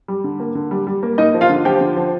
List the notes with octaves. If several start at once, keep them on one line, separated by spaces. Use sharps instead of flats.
G3
D3
A#3
D3
G3
G3
A#3
A#3 D#4 D#5
F3
F4 F5
D3
F3 G4 G5
D3
F3